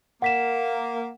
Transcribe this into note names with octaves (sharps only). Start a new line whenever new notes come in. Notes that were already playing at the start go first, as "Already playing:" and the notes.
A#3 F#5 B6 E7